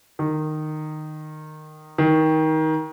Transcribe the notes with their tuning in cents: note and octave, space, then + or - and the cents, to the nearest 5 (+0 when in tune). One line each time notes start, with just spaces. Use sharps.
D#3 -15
D#3 +20